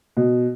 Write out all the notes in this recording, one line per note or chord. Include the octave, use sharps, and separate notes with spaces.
B2